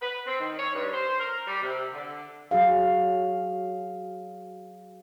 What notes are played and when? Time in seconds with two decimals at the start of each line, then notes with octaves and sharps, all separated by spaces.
0.01 B4
0.26 C4
0.40 D#3
0.58 C#5
0.74 G2
0.93 C5
1.19 A#4
1.47 G3
1.63 C3
1.93 D3
2.51 F#3 F#4 G#4 F5